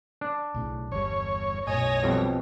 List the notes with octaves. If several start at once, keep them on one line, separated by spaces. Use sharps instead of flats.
D4
B1 A2 C#3
G1 E2 G3 C#5
B1 F#2 A2 C#5 D#5 G#5 A#6
F2 B2 G3